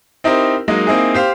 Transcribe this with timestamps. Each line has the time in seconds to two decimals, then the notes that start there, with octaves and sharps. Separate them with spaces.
0.24 C4 D#4 E4 G4 A#4 C5
0.68 F#3 G#3 A#3 D#4
0.87 A#3 C4 D#4 E4 G#4
1.14 G4 C5 F5